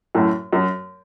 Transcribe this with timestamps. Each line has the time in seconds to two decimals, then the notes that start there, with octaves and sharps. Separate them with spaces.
0.15 F#2 A2
0.53 F#2